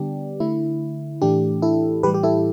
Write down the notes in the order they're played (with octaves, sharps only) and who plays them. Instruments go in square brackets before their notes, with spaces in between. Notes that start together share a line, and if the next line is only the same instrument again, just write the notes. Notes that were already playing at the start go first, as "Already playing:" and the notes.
Already playing: [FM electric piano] D3 G3 B3 D4 G4
D3 A3 E4
A2 E3 A3 D4 G4
E4 A4
A2 E3 G3 G4 B4
G4
E4 A4